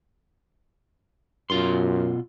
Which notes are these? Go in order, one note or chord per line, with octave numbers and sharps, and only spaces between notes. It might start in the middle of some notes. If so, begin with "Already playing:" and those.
F#2 B2 F4 C6